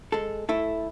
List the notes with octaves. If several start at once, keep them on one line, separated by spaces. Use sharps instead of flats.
G#3 A4
A3 E4 A4